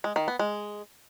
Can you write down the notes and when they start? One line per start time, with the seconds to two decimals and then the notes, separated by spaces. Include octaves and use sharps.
0.04 G#3
0.16 D#3
0.28 B3
0.39 G#3